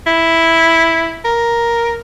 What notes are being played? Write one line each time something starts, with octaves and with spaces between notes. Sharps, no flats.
E4
A#4